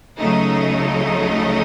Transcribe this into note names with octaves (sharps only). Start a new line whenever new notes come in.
C#2 C#3 F#3 A3 D#4